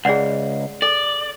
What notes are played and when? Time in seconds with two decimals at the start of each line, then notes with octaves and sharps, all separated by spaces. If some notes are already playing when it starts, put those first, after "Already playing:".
0.05 C#2 G#4 D5 F#5
0.82 A4 D5